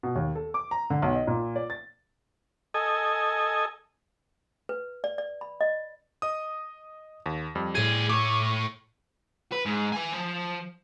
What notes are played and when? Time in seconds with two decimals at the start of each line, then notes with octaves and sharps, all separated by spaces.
0.03 B2
0.15 D#2
0.35 A4
0.54 D6
0.71 A#5
0.90 D3
1.02 B1
1.15 D#5
1.27 A#2
1.56 D5
1.70 A6
2.74 A4 D#5 G#5
4.69 B4
5.04 D5
5.18 D5
5.41 B5
5.61 D#5
6.22 D#5 D#6
7.26 D#2
7.55 F2 G3
7.75 A2 G3 G#4 G#6 D#7
8.10 A3 C#5 D6
9.52 B4
9.65 G#2
9.93 B4 G#5
10.12 F3